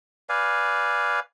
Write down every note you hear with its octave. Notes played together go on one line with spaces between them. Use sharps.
B4 D5 F5 G#5